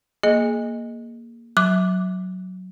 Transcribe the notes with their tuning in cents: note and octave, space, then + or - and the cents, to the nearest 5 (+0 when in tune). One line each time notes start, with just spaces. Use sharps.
A#3 +0 G#4 +20 D#5 +0
F#3 +0 D6 +0